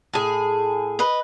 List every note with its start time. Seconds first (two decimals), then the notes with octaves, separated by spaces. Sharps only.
0.13 A2 G#4
0.99 B4 D#5